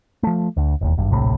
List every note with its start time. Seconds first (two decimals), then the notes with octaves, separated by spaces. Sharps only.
0.23 F3 A3
0.57 D2
0.81 E1 D#2
0.97 G#1 G2
1.10 D1 A#1 A2 C3